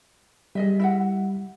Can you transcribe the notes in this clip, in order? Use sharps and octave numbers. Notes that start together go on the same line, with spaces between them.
G3 G#4 D#5 E5
E4 E5 F#5